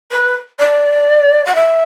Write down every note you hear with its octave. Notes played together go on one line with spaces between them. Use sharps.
B4
D5
F#5
E5